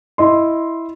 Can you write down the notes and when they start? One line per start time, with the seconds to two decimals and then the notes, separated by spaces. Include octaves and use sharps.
0.18 E4 D#5 C6